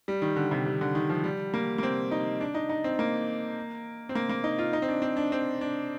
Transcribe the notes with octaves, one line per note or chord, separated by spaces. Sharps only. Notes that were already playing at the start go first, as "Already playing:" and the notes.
G3
D#3
D3
C3
C3
D3
D#3
F3
G3
A#3
A#3
C4
D#4
D4
D#4
D#4
C4
A#3
C4
A#3
A#3
D#4
F4
D#4
C4
D4
C4
D4
C4
D4